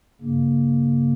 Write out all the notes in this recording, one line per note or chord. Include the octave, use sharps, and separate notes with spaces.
G2 C#3 A#3